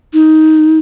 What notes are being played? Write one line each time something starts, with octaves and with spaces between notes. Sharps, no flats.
D#4